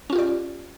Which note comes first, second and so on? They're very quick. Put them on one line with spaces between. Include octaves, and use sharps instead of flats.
C#4 F4 G4 D5